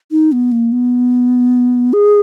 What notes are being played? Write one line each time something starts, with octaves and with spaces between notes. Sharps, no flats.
D#4
B3
A#3
B3
G#4